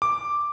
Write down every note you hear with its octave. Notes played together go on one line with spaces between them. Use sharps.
D6